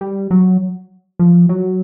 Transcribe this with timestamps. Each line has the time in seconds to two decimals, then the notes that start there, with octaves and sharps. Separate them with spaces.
0.01 G3
0.31 F#3
1.19 F3
1.49 F#3